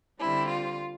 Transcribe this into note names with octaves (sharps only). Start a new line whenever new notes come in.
D3 G3 C4 E4
F4